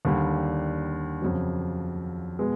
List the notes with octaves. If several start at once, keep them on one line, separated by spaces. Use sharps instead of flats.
D#2 D3 G3
F2 C#3 F#3
B2 G#3 B3